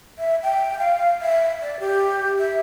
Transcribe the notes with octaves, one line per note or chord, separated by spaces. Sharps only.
E5
G5
F5
E5
D5
G4
E5